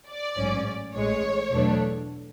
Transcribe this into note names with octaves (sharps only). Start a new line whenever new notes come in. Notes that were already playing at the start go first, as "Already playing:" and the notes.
D5
A1 G#2 F#3 C#4
A1 A2 G#3 C#5
E2 B2 F#3 A3 D4